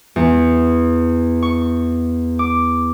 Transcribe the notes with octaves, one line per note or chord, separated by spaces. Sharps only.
E2
C#6
D6